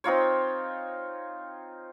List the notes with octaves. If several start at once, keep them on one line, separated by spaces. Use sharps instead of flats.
C4 D#4 F4 C#5